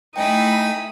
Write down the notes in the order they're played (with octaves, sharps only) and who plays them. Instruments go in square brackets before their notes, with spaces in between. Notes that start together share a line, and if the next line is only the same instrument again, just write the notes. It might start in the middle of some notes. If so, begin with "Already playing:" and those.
[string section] A3 E4 B6 [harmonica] D#4 [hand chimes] G5 G#5 [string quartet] D#6